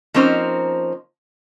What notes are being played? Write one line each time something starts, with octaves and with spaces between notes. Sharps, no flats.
F3 A#3 C4 C#4 D#4 C5